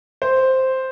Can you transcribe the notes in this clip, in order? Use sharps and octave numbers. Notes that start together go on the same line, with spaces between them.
C5